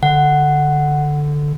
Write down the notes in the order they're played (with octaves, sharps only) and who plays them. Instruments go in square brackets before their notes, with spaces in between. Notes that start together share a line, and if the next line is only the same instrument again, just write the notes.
[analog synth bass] D3 [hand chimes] F#5